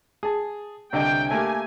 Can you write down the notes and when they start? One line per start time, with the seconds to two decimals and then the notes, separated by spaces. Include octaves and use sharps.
0.23 G#4 A5
0.93 C2 D3 D#5 G5
1.31 A3 A#3 G4 G#5